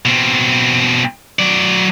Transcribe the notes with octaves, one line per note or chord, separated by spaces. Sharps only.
B2 C4
F#3 D5